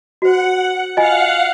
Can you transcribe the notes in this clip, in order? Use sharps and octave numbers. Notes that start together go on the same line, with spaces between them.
F#4 C5 F#5
F4 D#5 F5 F#5 G#5